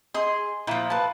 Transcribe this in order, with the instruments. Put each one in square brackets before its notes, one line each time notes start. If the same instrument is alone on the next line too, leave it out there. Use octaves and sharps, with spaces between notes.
[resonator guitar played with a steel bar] G#4 D#5 [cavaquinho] C6
[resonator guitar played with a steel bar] A#2 F3 [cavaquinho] E4
[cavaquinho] B4 A5